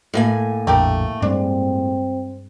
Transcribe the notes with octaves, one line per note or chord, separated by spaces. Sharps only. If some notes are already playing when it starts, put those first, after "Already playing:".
A2 A#3 G#5
A#1 F2 D3 A3 G4 A#4
G2 G#3 C4 D4